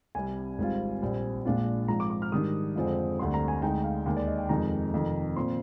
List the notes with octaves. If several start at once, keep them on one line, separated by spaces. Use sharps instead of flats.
C2 C3 G3 G#5
G#1 G#2 G3 C4 F4
A#1 A#2 G3 C4
A#1 A#2 G#3 D4 F4
G#2 F3 C4 A#5
D6
D6
F6
G#2 D#3 G3 D4 D#6
F2 D3 F3 G#3 C4
D2 D3 G3 C4 C6
A#5
G#5
D2 D3 G#3 D#4 G5
F5
D#2 D#3 G#3
D5
D#5
G5
F2 C3 D#3 G#3 D#4 A#5
F1 F2 D#3
A#2 F3 C4 C6